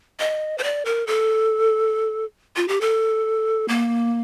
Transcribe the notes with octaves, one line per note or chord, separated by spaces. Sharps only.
D#5
C5
D5
A#4
A4
F4
G4
A4
A#3